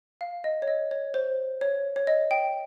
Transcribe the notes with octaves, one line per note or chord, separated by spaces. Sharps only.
F5
D#5
C#5
D#5
C#5
C5
C#5
C#5
D#5
G5